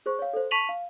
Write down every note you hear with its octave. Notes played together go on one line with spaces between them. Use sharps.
G#4 C5 C#6
C#5 F5
A4 C5
A5 C#6 B6 D#7 F7 F#7
F5